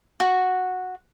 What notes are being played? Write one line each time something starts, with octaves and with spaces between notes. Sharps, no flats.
F#4